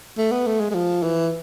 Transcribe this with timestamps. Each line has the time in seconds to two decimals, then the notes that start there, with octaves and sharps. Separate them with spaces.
0.18 A3
0.32 B3
0.46 A3
0.60 G#3
0.71 G#3
0.74 F3
1.03 E3